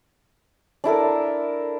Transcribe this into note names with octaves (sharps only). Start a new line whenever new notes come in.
D4 E4 A4 A#4